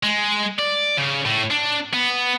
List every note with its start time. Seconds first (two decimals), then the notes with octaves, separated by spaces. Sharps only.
0.03 G#3
0.59 D5
0.98 C#3
1.26 A2
1.51 D4
1.93 B3